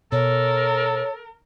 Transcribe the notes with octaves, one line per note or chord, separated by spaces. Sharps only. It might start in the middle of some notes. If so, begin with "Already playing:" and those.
B2 A4 A#4 C#5